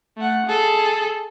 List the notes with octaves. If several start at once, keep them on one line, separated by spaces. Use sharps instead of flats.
A3 F#5
G#4 A4